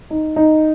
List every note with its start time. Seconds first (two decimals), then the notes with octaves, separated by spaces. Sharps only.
0.10 D#4
0.36 D#4